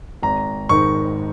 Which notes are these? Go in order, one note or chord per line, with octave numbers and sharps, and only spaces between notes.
G#1 A#5
G#2 D#3 C#6